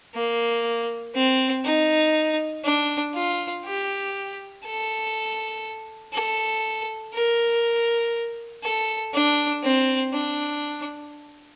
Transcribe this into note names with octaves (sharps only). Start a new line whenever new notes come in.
A#3
C4
D#4
D4
F4
G4
A4
A4
A#4
A4
D4
C4
D4